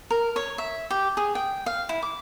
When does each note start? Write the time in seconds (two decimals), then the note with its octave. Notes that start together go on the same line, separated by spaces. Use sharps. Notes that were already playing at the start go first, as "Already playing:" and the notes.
0.11 A#4
0.36 C#5
0.58 E5
0.90 G4
1.17 G#4
1.35 G5
1.66 F5
1.89 E4
2.02 D6